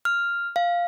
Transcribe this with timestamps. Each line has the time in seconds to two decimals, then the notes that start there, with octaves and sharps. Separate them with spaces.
0.05 F6
0.56 F5